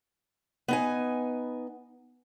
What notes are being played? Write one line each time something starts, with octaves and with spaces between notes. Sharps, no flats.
B3 D#4 G#5